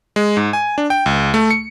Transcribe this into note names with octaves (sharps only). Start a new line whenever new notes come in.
G#3
G#2
G#5
D4
G5
C#2
A3
C#7